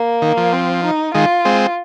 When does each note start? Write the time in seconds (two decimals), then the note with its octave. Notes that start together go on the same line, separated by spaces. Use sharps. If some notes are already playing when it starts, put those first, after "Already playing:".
Already playing: A#3
0.22 D#3
0.37 F3
0.53 C4
0.84 D#4
1.14 D#3 G#3 F4
1.45 G#3 C4